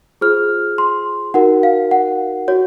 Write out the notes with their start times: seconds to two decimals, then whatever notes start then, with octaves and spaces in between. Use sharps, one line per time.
0.21 F4 G#4 C5 F6
0.78 C6
1.34 D#4 F#4 A#4 F#5
1.63 F5
1.91 F#5
2.48 F#4 C#5